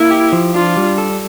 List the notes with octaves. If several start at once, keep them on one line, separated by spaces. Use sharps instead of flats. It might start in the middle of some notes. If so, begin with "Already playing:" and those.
Already playing: A#3 E4
G4
F3
D4 F4
G3
A4